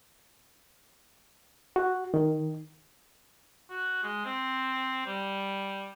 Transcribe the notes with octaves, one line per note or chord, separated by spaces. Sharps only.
F#4
D#3
F#4
G#3
C4
G3